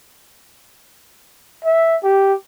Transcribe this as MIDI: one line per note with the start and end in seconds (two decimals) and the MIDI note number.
1.65 1.97 76
2.03 2.33 67